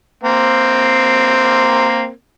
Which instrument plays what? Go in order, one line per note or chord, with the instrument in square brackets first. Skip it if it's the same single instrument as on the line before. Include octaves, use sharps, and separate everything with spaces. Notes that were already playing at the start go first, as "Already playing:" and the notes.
[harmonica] A#3 C4